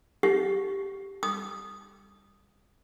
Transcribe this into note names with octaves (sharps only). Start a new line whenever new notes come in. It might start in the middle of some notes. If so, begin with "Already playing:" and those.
G4
D#6